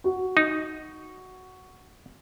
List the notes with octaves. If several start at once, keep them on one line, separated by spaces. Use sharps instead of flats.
F#4
D#4